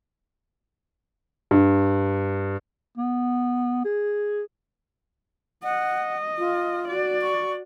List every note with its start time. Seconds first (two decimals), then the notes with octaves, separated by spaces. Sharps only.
1.51 G2
2.97 B3
3.85 G#4
5.63 D#5 F#5
6.38 F4
6.88 F#4 D5
7.22 C#6